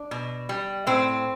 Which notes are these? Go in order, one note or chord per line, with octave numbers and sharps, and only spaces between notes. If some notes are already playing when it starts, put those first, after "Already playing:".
Already playing: D4
B2
G3
A2 C4